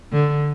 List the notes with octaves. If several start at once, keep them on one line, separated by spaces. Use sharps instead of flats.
D3